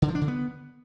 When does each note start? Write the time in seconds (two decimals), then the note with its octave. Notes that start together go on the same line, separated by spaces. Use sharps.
0.02 D3
0.08 F3
0.15 D4
0.21 D3
0.28 B3